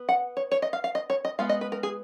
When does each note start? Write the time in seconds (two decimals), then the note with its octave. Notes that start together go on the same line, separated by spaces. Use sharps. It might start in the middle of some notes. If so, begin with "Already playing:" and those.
Already playing: B3
0.09 F#5
0.37 C#5
0.52 C#5
0.62 D#5
0.73 F5
0.84 F5
0.95 D#5
1.10 C#5
1.25 D#5
1.39 G#3 B3 F4 F5
1.49 D#5
1.61 B4
1.72 A#4
1.83 G#4